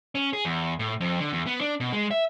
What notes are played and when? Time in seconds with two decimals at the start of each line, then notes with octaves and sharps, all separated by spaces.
0.15 C#4
0.33 G#4
0.45 E2
0.79 A2
1.00 F2
1.20 D3
1.33 E2
1.47 B3
1.61 D4
1.80 B2
1.93 G#3
2.11 E5